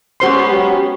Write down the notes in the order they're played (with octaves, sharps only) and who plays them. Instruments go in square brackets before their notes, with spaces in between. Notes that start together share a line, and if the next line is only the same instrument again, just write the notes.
[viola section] G#3 B3 C#4 [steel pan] F#4 C5 C6
[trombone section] F#3 [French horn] G4